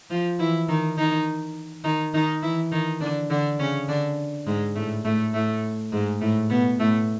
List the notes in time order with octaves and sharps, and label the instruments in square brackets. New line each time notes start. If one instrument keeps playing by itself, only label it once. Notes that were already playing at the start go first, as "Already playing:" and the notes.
[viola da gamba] F3 F4
E3 E4
D#3 D#4
D#3 D#4
D#3 D#4
D#3 D#4
E3 E4
D#3 D#4
D3 D4
D3 D4
C#3 C#4
D3 D4
G#2 G#3
A2 A3
A2 A3
A2 A3
G#2 G#3
A2 A3
B2 B3
A2 A3